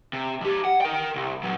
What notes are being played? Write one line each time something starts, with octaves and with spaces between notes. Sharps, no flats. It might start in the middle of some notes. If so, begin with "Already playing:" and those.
C3
F2 G4
F#5
A#4 G5
C2
A#2 F#3